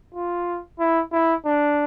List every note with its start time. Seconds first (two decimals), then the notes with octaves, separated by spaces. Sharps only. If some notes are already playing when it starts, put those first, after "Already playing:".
0.14 F4
0.79 E4
1.12 E4
1.45 D4